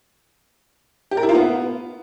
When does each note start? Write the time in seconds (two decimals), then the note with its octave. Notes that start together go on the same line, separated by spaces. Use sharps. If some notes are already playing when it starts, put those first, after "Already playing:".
1.11 G4
1.17 A#4
1.23 E4
1.29 F4
1.35 B3